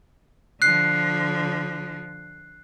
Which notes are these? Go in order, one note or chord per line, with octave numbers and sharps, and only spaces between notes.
D3 F3 F#6 C7